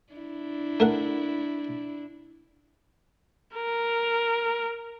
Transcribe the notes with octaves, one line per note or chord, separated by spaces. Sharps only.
D4 E4
A3 A#4 F#5
A#4